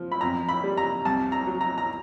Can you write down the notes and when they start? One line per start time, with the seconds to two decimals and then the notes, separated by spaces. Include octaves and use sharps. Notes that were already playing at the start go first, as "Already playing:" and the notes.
Already playing: F3
0.12 B5
0.21 F2 A#5
0.49 B5
0.64 G3
0.77 A#5
1.05 C2 A5
1.32 A#5
1.47 F#3
1.61 A#5
1.78 A#5